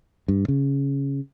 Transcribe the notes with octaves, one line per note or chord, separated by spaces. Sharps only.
G2
C#3